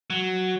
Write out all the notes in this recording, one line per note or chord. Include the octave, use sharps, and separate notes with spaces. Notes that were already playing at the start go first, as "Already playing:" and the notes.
F#3